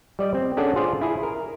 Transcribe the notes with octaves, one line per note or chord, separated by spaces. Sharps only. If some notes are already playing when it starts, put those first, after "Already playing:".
G3 D5 D#5
C4
C#4 D4 G#4 A4 D5 F#5
F4 G#4 C5 D5 F5
E4 G#4
A#4